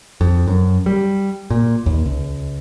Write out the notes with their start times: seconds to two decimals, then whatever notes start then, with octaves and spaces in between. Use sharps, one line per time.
0.21 F2
0.48 F#2
0.86 G3
1.50 A#2
1.86 D#2
2.05 C#2